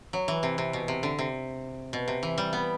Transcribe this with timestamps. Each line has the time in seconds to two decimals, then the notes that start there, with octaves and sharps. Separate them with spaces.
0.13 F#3
0.28 E3
0.43 C3
0.58 C3
0.73 B2
0.88 C3
1.03 D3
1.19 C3
1.93 B2
2.08 C3
2.23 E3
2.38 G3
2.53 B3